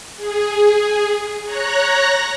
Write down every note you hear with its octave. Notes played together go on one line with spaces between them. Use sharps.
G#4
C#5 A#5 F#6 A#6